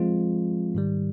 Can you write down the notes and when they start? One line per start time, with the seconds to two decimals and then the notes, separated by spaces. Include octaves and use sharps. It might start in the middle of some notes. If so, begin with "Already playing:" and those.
Already playing: F3 G#3 C4 F4
0.75 G#2 D#3 G3